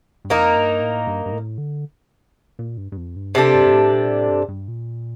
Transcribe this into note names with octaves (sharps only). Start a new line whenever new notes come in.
G2
F2 A#3 D#4 A#4
G2
A2
G2
G2
A2
D3
A#2
G2
G2
F2
G2
C3 G3 D4 A4
G2
G2
A2
A#2
A2
G2
G2
A#2